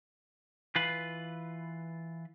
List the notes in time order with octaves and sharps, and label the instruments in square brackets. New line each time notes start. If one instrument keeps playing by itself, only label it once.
[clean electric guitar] E3 F4 B4